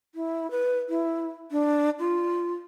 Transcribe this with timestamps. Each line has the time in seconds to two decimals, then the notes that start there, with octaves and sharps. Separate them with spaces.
0.15 E4
0.51 B4
0.89 E4
1.52 D4
1.99 F4